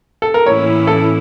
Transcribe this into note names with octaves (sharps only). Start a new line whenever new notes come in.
A4
A#4
A2 E3 A#3 C#4 E4 C#5
A4